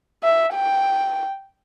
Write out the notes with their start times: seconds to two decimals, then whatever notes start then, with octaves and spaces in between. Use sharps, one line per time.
0.23 E5
0.54 G5